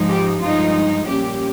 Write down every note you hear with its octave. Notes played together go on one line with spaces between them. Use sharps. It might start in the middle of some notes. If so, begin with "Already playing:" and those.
Already playing: G#2 F3 G#3 D#4
G4
G2 F3 G#3 D#4 F4
A#2 G3 C#4 G4